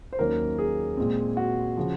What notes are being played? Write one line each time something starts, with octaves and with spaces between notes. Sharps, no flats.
C5
D#2 D#3 F#3 A#3 C#4 A#4
G#4
A#2 G#3 C4
F#4
C#3 F3